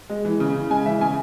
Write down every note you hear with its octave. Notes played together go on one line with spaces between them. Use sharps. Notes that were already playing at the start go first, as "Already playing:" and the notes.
G#3
E3
C#3
C#3
G#3 G#5
E3 E5
C#3 G#5